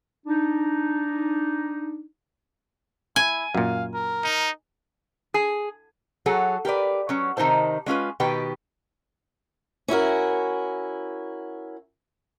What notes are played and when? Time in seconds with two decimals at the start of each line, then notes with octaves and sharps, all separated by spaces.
0.26 D4 D#4
3.16 E4 G#5
3.55 F#2 A#2 F5
3.94 A#4
4.24 D#4
5.34 G#4
6.26 F#3 F#4 G#4 A4 C#5
6.65 G4 A#4 B4 D5
7.09 F#3 C#4
7.37 C3 D#3 D#4 E4 C5 A5
7.86 G#3 C#4 F4 B4
8.20 B2 D#3 G4 B4 G5
9.88 C#4 E4 F#4 A#4